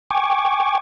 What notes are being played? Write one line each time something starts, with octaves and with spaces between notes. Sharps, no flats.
G5 G#5 C#6 D6